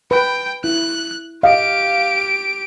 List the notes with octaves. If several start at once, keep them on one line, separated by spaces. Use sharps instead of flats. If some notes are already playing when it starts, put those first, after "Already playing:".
B4 G5
E4 F#6
G4 D#5 F5 D7